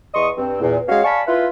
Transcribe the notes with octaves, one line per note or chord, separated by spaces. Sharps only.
E2 D#5 C6 C#6 D#6
G2 C4
E2 A#2
G#3 C#4 F#4 C#5 F5
D5 F5 G#5 A5 B5 C#6
E4 F4 B4